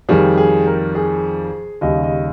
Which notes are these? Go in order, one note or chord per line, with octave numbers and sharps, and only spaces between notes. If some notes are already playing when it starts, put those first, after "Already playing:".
F2 D#3 G3 G#4
G#4
A#4
G#4
D#2 C#3 G3 D#5
D#5